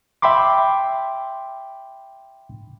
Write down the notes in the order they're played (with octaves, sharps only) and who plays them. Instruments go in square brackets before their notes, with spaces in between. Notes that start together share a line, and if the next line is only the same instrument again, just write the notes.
[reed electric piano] E5 G5 B5 C6 D6